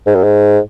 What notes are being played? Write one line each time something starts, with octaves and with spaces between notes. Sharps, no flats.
G#2
F#2
G#2